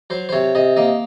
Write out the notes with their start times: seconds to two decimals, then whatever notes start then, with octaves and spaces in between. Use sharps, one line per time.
0.10 F#3 C5
0.29 C5
0.32 C3 C#5
0.55 C3 D#5
0.76 A#3 D#5